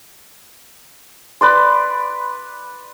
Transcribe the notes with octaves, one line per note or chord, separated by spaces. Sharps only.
B4 D5 C6